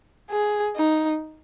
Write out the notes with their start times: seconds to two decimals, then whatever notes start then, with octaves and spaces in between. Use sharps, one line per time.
0.30 G#4
0.76 D#4